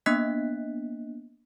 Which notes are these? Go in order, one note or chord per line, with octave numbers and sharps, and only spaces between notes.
A#3 B3 D4 D#5 F#6 B6